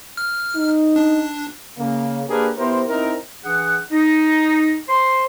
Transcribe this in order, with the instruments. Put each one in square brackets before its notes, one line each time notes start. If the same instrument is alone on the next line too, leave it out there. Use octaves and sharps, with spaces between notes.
[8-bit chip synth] F6
[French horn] D#4
[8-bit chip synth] D4
[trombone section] C#3 A#3
A#3 D4 G4 G#4 A#4 B4
B3 E4 G4 A#4 C5
C4 D#4 E4 A#4
[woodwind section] E3 D4 G#4 F#5
D#4
C5 C6